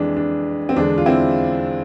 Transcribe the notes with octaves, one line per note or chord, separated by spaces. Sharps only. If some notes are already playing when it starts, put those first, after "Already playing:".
Already playing: F2 E3 G#3 D4
D4
C4
E2 D3 G#3 D4
F4
C4 E4